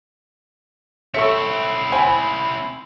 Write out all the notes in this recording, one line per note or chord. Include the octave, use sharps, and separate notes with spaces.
C4 E4 A4 C#5 E5 C#6 C#7
C5 G5 G#5 B5